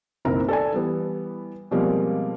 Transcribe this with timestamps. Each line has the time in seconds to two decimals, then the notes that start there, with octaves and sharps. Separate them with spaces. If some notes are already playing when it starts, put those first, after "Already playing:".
0.25 F#1 B1 C4 E4 A#4 A#5
0.49 A4 D5 G#5
0.72 E3 G3 B3
1.71 B2 F3 G3 G#3 A#3 C4